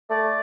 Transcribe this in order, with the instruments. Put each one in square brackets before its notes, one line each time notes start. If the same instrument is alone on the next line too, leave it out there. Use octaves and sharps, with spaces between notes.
[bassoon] A3 [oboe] D5